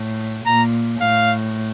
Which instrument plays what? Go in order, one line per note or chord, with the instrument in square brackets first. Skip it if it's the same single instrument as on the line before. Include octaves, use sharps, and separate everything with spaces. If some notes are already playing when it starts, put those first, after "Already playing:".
Already playing: [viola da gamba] A2
[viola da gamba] A#2 [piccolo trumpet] A#5
[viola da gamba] A2 [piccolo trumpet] F5